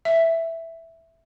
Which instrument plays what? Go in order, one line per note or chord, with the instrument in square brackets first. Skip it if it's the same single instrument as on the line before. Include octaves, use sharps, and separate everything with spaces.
[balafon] E5